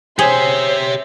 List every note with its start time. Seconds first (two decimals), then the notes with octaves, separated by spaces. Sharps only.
0.19 G4 G#4 C5 C#5 E5